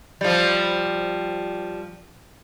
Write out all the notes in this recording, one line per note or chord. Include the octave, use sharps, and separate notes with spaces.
F3 G3